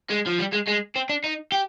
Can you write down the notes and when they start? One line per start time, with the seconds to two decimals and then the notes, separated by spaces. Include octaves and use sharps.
0.10 G#3
0.27 F3
0.39 G3
0.53 G#3
0.68 G#3
0.96 C4
1.09 D4
1.24 D#4
1.52 G4